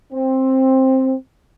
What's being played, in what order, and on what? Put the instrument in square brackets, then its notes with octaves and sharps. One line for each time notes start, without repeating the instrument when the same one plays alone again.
[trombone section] C4